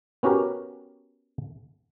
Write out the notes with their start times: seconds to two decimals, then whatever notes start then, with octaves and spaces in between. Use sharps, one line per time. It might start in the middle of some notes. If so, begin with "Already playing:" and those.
0.23 B3 C#4 F#4 G4 A#4